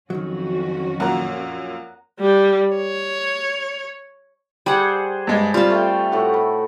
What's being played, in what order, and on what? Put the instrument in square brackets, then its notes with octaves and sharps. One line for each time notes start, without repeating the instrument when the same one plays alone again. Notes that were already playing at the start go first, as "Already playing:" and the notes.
[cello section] F2 C#4 F#4 [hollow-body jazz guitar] D#3 F#3
[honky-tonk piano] F#2 A#2 A#3 [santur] F#5 A#5
[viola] G3
C#5
[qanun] G3 F#5 [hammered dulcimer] G#4 C5 G#5
[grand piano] G2 G#3
[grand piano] G3 C4 [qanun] F4 A5
[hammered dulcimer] A3 G5
A2 F#4
B5